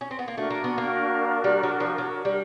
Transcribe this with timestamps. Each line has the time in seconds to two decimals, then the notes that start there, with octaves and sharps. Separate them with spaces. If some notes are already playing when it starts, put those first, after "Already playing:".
0.01 C#4
0.11 C4
0.19 B3
0.28 A#3
0.37 A3 D4 F#4 A#4
0.50 A#3
0.64 B3
0.78 A#3
1.44 G3
1.63 F#3
1.80 F3
1.98 F#3
2.25 G3